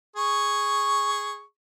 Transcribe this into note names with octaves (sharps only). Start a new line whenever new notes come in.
G#4 C#6